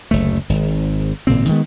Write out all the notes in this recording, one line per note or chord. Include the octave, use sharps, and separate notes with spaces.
F#1 D2 A3
G#1 G#2
G#1 A#2 C#3 C4
D#3 G#3 B3